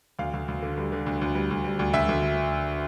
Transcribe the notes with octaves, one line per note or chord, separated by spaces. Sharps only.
D2 F5
D2
D2
D3
G3
D3
D2
D2
G3
D2
G3
D2
D2 E5
D2